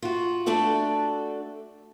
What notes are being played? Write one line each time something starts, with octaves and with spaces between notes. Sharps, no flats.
F4 F#4
A3 D4 F#4 A4 D5